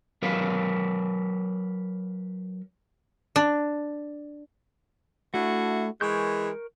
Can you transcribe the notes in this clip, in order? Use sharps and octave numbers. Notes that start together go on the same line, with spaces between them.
F#3 A#4 B4 C#5 F5
D4
A3 D4 E4 F#4
E3 G#3 A#4 C#6 G6